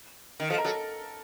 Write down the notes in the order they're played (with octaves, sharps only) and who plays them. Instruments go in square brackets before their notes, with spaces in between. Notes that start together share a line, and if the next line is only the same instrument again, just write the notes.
[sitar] D#3
[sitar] F3 [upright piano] A4
[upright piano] A#4
[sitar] F#3 [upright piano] A4